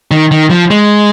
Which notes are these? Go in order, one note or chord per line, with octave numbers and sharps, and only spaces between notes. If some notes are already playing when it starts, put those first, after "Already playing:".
D#3
D#3
F3
G#3